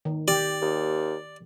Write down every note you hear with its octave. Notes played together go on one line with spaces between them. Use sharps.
D#3
G4 D5
D#2